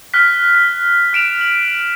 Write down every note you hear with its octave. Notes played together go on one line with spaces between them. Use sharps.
F6 F#6 B6
B6
F6 D7 E7 F7
F#7